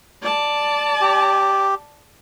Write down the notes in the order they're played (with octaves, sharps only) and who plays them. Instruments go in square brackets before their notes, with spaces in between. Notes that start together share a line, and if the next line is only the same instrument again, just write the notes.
[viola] D5 A5
[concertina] G4